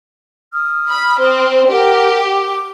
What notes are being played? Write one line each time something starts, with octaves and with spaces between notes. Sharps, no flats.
D#6 F6
B5
C4
G4 A#4 F#5
D6